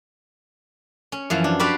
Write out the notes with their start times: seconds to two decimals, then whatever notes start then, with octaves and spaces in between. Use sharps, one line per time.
1.12 C#4
1.30 F#2 E3 F3
1.44 D4
1.60 F#4 G4 B4 C5 D5 F5